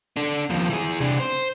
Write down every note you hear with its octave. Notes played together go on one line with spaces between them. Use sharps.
D4 A4
D#2 F3
E3 G#4
C3 D4
C5